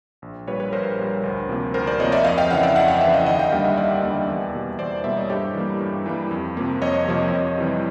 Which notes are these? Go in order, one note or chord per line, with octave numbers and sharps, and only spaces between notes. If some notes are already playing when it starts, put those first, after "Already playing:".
A#1
A#2 G3 B4 C#5
B4 C#5
A#1 A#4 C5
A#2 G3
D2
C3 F3 A#3
D2 A#4 C5
C5 D5
C3 F3 A#3 C#5 D#5
D5 E5
F2 D#5 F5
F5 G5
C#3 E3 E5 F#5
D5 E5
F2 E5 F#5
F5 G5
C#3 E3 E5 F#5
D#5 F5
D#2 D#5 F5
F5 G5
D3 G3 A#3 F5 G5
E5 F#5
D#2 D5 E5
D3 G3 A#3
E2
B2 G3 A#3
E2 C5 D5
B2 G3 A#3 D5 E5
C#5 D#5
G2 G4 A4
E3 G3 A#3
G2
E3 G3 A#3
F2
C3 F3 A#3
F2 C#5 D#5
C3 F3 A#3
F2
C3 E3 G3